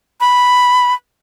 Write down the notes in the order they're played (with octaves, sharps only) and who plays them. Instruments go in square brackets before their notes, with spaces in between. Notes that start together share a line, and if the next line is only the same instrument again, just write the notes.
[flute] B5